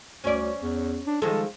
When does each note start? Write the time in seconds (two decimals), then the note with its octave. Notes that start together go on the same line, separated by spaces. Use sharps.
0.24 D2 C#4 D5
0.62 E2
1.07 D4
1.22 D#3 F3 G#3 A4